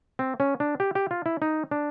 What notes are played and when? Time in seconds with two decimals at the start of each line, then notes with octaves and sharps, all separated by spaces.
0.19 C4
0.40 C#4
0.60 D4
0.80 G4
0.95 G4
1.11 F4
1.26 E4
1.42 D#4
1.71 D4